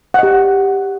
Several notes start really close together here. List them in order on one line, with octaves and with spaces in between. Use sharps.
F#5 D#5 G4